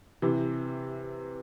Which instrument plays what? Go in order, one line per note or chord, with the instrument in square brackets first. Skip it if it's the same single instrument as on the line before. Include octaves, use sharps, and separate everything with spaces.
[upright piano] C3 E3